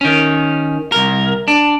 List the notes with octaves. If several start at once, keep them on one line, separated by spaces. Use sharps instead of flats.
D#3 C#4
C2 A#4
D4